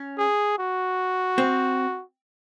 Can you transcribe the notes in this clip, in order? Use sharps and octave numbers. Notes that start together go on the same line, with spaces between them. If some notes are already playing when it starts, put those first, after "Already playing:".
Already playing: C#4
G#4
F#4
C4